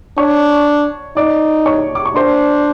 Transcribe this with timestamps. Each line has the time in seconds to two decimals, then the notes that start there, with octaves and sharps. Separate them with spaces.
0.18 D4 C#5 C#6
1.17 D#4 D5 D6
1.66 C#5 C#6
1.95 D6
2.05 C#6
2.15 D4 C5 C6